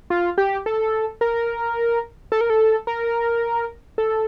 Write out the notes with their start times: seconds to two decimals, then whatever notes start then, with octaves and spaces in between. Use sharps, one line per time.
0.10 F4
0.38 G4
0.66 A4
1.21 A#4
2.32 A4
2.41 A#4
2.50 A4
2.87 A#4
3.98 A4